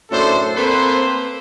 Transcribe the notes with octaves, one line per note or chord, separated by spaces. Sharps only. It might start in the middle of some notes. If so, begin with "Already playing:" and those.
F#2 A2 D4 A4 C5
A#3 C4 A4 B4 C5